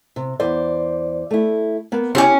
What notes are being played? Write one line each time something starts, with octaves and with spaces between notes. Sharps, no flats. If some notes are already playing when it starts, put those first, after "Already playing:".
C3
E2 C5 D5
A3 E4
A#3 B3
C4 C#4 E4 G4 G#5